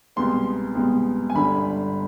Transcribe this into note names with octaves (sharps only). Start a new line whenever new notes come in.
C2 B2 G#3 B3 C6
C2 B2 G#3 B3
G#5
G1 G2 D3 B5